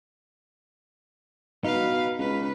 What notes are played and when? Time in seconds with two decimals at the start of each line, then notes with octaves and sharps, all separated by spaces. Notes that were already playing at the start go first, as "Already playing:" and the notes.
1.64 B2 D#4 B4 F5
2.19 C#2 B4